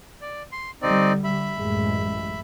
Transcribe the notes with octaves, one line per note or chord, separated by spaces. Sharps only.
D5
C6
D3 G3 C4 D#4 D5
E5 B5
A1 F#2 G#3